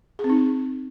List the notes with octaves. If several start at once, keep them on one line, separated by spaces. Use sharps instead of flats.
G#4
C4
D#4